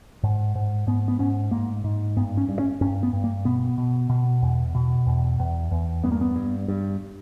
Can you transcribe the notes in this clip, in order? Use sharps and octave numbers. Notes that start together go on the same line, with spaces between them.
G#2
G#2
G#2 B3
B3
G#2 C#4
G#2 A#3
G#2
G2 B3
C#4
G2
C#4
G2 C#4
B3
G2
A#3
B2 B3
B2
B2
E2
B2
E2
E2
E2
G2 B3
A#3
B3
G2
G2